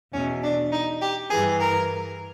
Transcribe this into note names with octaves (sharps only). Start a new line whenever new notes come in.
E2 B2 C#4
D4
D#4
G4
G2 E3 G#4
A#4